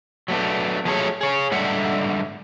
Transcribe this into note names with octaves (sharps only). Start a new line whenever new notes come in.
F#3 A3 B3 D4
F3 F#3 A3 G#4 A4 C#5
G#4 C#5
G#2 D3 G3 E5 F#5